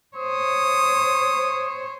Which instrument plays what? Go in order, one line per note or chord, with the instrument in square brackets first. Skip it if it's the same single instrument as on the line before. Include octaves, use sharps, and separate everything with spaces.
[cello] C5 C#5 [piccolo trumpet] D#6